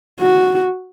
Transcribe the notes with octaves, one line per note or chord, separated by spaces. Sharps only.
F#4